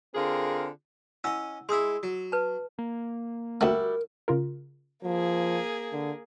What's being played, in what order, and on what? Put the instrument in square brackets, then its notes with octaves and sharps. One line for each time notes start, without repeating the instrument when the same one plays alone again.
[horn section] D3 C4 F4 G#4 A#4
[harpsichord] C#4 D#5 [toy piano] E4 F#5 E6
[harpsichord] G#3 E4 [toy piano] C6 D#6 E6
[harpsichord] F#3
[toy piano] B4 A5
[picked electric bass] A#3
[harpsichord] D2 A3 [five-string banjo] G3 F#4 E5 [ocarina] A#4
[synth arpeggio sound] C#3 F4 A#4
[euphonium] F3 [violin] A#3 G#4
[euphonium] D3